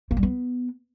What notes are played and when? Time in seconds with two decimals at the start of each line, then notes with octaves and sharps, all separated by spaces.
0.11 A#3
0.17 G3
0.23 B3